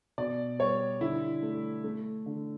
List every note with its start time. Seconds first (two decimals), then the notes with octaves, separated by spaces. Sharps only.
0.18 B2 D5
0.59 G3 C#5
1.01 D3 E4
1.42 A3
1.84 A3
2.26 D3